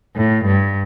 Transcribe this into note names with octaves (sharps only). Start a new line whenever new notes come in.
A2
G2